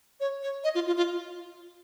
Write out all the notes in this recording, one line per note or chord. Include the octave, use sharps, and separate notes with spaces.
C#5
C#5
D#5
F4
F4
F4